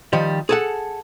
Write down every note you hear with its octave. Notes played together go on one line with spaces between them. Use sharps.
D#3 F3 G3
G#4 A4 F#5